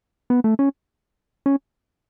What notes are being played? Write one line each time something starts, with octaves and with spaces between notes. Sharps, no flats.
B3
A3
C#4
C#4